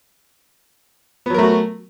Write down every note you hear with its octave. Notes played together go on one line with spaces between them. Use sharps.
F#3 A3 B3 F#4 A#4